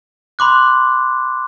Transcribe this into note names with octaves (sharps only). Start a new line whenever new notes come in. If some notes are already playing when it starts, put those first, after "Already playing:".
B5 C6 D6 F#6